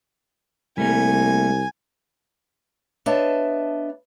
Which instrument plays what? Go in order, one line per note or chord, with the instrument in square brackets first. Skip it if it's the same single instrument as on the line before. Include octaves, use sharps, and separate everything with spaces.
[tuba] C2 [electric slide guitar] G3 A3 A#3 [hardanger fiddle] G#5
[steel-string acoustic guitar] B3 D4 C#5 D#5 E5 A5